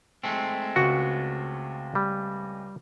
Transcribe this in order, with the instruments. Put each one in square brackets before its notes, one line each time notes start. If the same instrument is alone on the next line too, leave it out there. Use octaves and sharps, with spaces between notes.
[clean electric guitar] G#3 A3 C4
[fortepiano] C#2 C#6 [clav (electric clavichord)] F#4
[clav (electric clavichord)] G3